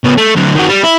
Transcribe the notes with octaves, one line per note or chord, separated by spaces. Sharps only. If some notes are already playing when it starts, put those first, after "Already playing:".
C#3 B3
A3
D3 F#3
D#3 F#4
G3
E4